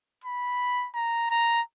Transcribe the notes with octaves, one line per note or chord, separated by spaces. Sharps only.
B5
A#5
A#5